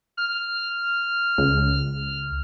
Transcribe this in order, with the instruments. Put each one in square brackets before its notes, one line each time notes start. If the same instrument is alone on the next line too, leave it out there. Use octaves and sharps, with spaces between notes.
[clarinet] F6
[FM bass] C#2